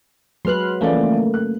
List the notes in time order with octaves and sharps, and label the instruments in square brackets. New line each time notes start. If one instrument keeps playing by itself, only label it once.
[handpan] F#3 B4 [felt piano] G#3 [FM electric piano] C6 F6 F#6
[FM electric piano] C#3 A3 A#3 [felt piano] E3 F3 D5
[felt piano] F#6